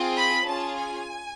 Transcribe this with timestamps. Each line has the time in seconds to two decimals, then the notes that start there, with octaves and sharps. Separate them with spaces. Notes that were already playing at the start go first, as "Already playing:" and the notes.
Already playing: C4 F4 G#4
0.16 B5
0.47 C#4 F4 G#4 A5
0.78 G#5